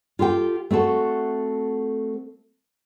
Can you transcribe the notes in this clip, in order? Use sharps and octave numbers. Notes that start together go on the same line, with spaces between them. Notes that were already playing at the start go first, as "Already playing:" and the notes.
F4 G4 A4 G5
A3 C4 F#4 A4